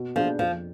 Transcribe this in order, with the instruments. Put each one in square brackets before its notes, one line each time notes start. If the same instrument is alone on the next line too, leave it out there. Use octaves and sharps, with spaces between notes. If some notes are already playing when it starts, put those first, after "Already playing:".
Already playing: [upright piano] B2
[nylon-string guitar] F3 [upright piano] B3 D4 G#4
[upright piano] F2 [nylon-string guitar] F3